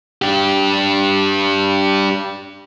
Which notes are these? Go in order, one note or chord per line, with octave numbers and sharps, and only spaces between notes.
D4 G4